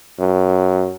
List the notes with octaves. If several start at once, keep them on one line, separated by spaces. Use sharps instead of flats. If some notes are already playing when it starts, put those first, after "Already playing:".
F#2